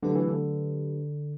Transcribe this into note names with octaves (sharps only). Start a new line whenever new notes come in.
D3 F#3 A3 D4 G4 B4
E3
D3